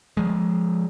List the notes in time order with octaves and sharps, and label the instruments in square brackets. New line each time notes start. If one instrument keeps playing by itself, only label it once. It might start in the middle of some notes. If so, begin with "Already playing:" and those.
[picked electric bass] F3 G#3